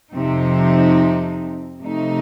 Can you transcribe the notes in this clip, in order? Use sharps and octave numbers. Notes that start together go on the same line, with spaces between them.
F2 C3 F3 C4 D#4
C3 F3 A3 D#4